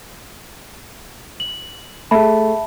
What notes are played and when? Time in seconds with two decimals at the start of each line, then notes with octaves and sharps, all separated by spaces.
1.40 F#7
2.11 A3 G#4 E5 A5 B5